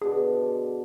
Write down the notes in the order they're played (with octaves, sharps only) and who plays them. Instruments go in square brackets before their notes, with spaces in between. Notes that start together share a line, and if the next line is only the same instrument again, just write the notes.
[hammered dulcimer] B2 D3 [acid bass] G#4